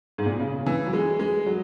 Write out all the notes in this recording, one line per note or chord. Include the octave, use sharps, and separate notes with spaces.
G#2
A#2
B2
C#3
E3
F#3
G#3
G#3
F#3